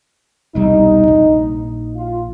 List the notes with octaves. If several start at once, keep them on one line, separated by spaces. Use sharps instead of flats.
E1 C2 G3 D#4
A#1
F4